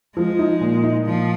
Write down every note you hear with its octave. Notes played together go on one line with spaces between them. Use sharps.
F3 G#3
D#4
A#2
D#4
A#2 F3